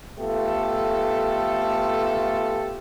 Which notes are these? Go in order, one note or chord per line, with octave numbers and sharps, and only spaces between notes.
A3 B3 F4 G4 A4